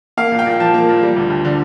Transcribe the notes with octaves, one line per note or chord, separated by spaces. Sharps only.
A#3 F5
A#2
G5
A#2
F3 A5
A#3
A#2
G3
D2
D2
D3